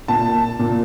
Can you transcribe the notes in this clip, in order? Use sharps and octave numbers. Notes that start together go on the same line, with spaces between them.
A#2 A5
A#2